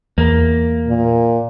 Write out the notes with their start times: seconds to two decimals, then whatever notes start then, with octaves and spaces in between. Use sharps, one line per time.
0.18 E2 A#3
0.88 A#2